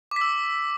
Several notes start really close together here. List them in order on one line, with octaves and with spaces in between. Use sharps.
D6 B6 E6